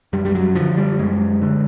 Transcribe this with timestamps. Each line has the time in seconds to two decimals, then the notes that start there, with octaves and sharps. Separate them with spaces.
0.13 F#2 G3
0.25 G3
0.35 F#3
0.55 D3 F3
0.77 G3
0.99 F#2 G#3
1.42 D3